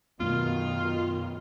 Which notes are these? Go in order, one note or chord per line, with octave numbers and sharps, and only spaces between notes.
F#2 B2 D#3 A3 B3 F4